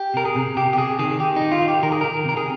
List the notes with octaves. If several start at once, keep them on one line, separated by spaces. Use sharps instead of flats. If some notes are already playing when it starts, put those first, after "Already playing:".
Already playing: G4
C3 A#4
G#4
C3
C3 G4
G4
C3 G#4
D#3 G#4
D#3 G4
D#4
D#3
F4
D#3
G4
D#3 A#4
G#4
D#3 A#4
C3 A#4
G#4